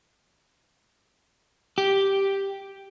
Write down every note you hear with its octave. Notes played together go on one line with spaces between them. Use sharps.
G4